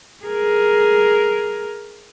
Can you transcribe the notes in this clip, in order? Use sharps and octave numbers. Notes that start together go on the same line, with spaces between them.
G#4 A#4